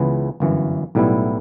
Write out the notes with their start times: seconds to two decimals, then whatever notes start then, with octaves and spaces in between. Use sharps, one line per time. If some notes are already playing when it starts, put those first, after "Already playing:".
Already playing: C#2 C#3 E3 B3
0.40 G1 F#2 E3
0.95 B1 A2 G3 B3 E4